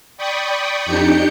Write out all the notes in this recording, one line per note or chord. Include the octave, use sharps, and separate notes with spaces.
D5 G5 B5 C#6 D#6
F2 D4 D#4 G4 G6 C#7